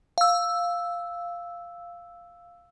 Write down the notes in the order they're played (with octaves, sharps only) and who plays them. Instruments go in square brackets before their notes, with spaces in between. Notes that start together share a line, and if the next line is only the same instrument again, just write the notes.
[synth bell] F5 E6